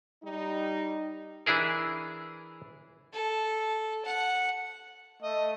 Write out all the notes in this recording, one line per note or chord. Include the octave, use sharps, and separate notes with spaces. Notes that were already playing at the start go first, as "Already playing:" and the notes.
G3 D#4
E3 D4 E4 G#4 A#4
A4
F#5
A3 D#5